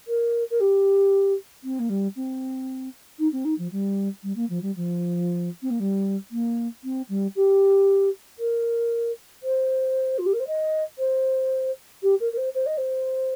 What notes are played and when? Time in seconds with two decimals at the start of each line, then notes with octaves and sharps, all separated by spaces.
0.07 A#4
0.50 A#4
0.60 G4
1.63 C4
1.79 A#3
1.89 G3
2.16 C4
3.19 D#4
3.32 C4
3.45 D#4
3.58 F3
3.72 G3
4.23 G3
4.36 A#3
4.49 F3
4.62 G3
4.76 F3
5.62 C4
5.70 A#3
5.80 G3
6.31 A#3
6.84 C4
7.09 G3
7.36 G4
8.39 A#4
9.43 C5
10.18 F4
10.26 G4
10.33 A#4
10.39 C5
10.47 D#5
10.98 C5
12.03 G4
12.20 A#4
12.33 A#4
12.37 C5
12.55 C5
12.66 D#5
12.78 C5